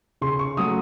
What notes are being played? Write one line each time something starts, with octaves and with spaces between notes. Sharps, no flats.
C#3 C6
C#6
F#3 A3 C#4 D#6